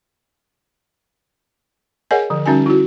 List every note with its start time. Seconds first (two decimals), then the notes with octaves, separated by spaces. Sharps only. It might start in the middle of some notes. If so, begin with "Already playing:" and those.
2.11 G#4 A#4 C#5 D#5 F#5 G#5
2.30 D3 F3
2.46 D3 G3 C#4 D#4 F#4 G#5
2.66 E4 F#4